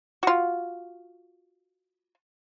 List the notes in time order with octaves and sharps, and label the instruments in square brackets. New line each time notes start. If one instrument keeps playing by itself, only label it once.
[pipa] F4 F#4